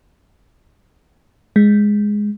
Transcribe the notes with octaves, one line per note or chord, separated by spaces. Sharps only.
G#3